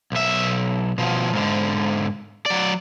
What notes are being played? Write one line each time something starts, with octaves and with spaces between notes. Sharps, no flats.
B1 E5
B2 F3
G#2 D3
F#3 D5